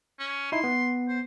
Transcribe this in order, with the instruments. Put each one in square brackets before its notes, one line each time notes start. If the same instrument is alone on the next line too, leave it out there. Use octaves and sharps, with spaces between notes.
[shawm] C#4
[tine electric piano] D#4 E4 [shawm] C6
[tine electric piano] B3
[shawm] C5